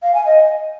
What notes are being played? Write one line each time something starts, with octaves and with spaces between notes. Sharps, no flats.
F5
G#5
D#5